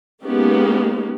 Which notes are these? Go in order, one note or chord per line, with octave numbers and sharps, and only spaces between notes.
G#3 A#3 B3 C#4 D#4 G4